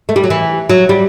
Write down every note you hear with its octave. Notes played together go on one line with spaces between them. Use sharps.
A3
G3
F#3
E3
F#3
G3